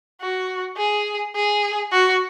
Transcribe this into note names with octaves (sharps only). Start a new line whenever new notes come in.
F#4
G#4
G#4
F#4